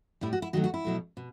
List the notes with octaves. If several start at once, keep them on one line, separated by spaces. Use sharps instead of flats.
A2 G3 E4
F#4
E4
D#3 F#3 A3 F#4
F#4
E4
B2 F#3 A3
B2